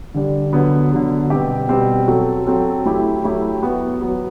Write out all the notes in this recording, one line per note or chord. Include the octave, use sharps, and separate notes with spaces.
D3 G3 D4
D3 F#3 B3
D3 F#3 B3
B2 G3 C4 G4
B2 G3 C4 G4
F#3 C4 F#4 A4
F#3 C4 F#4 A4
F#3 A3 E4 G4
F#3 A3 E4 G4
F#3 B3 F#4
F#3 B3 F#4